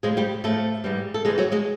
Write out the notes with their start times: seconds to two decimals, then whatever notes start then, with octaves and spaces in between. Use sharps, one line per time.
0.03 A2 F3 G#3 G#4
0.17 G3 G4
0.44 A2 F3 A3 A4
0.84 G#2 E3 G3
1.14 A4
1.25 G#2 E3 G3 G#3 G#4
1.38 F#3 F#4
1.52 G#3 G#4